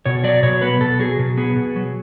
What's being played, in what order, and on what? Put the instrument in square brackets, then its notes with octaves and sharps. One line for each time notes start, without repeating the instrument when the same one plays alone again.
[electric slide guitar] B2 C#5
F#3 D5
B2 C#5
B3 B4
B2 A4
F#3 G#4
B2
B3 G#4
B2
F#3